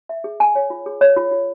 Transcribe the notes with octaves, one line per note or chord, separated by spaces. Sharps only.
E5
G#4
G#5
C#5
F4
G#4
C#5
F4
F4